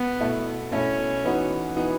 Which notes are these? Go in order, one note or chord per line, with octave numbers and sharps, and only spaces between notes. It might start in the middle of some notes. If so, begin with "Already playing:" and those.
Already playing: B3
B2 A3 E4
B2 A3 C#4 E4
E3 B3 D#4 F#4
E3 B3 D#4 F#4